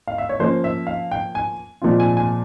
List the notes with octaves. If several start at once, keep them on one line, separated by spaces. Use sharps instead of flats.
F5
E5
C#5
F3 A#3 C#4 C5
E5
F5
G5
G#5
A#2 F3 G#3 C4 F4
G#5
G#5